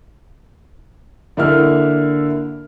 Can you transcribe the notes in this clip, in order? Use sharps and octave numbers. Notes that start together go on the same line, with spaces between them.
D3 A#3 E4 F6